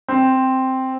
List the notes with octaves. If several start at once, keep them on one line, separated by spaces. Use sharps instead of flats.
C4